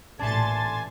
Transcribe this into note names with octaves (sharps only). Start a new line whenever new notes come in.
A1 A#2 A3 D4 G#5 A5 C6 A6